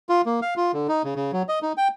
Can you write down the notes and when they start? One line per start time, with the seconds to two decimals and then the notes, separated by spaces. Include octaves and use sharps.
0.09 F4
0.26 A#3
0.42 F5
0.57 F4
0.74 D3
0.89 D#4
1.04 C#3
1.16 C#3
1.33 F#3
1.49 D#5
1.62 D#4
1.77 G5